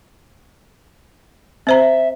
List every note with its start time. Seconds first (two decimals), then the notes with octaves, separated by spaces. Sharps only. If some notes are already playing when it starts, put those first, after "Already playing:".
1.67 C4 C5 E5 A#5